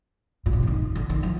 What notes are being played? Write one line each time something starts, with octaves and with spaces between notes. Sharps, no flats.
A#2
C3
D3
D#3
D3
D#3
F3